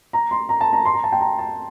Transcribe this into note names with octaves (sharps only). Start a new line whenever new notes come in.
A#5
C6
A#5
A5
A#5
C6
A#5
A5
G5
A#5
A5